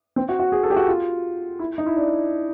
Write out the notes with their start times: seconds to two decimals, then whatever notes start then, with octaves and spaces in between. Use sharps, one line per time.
0.16 C4
0.29 F#4
0.39 F#4
0.52 G#4
0.63 A4
0.70 G4
0.76 F#4
0.88 F4
1.59 E4
1.78 D#4
1.86 E4
1.96 D4